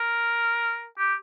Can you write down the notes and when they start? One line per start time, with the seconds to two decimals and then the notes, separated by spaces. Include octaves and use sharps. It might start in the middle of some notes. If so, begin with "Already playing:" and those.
Already playing: A#4
0.99 G4